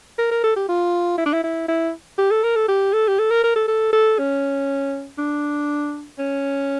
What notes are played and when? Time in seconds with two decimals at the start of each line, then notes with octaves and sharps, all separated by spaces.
0.18 A#4
0.31 A#4
0.44 A4
0.56 G4
0.69 F4
1.18 E4
1.26 D4
1.33 E4
1.44 E4
1.69 E4
2.18 G4
2.31 A4
2.44 A#4
2.56 A4
2.68 G4
2.93 A4
3.08 G4
3.19 A4
3.31 A#4
3.44 A#4
3.56 A4
3.68 A4
3.93 A4
4.19 C#4
5.18 D4
6.19 C#4